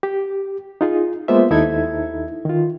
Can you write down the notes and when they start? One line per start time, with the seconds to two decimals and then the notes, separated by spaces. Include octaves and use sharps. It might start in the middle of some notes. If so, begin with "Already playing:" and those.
0.03 G4
0.81 D#4 F4 G#4
1.28 G#3 A#3 B3 F4 C5 E5
1.51 D#2 D#4 E4 A4 E5 G#6
2.45 D#3 F4